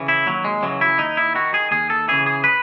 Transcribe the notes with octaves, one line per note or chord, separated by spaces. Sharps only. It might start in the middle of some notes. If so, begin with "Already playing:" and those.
Already playing: C#3 E3
E4
D#2 F#3
G#3
C#3 E3 F#3
E4
D#2 D#4
E4
D#3 F#4
G#4
D#2 G#4
A4
C#3 E3 G#4
G#4
B4